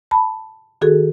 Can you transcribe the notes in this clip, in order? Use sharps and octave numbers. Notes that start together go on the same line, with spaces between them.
A5 B5
D#3 F#4 G#4 A4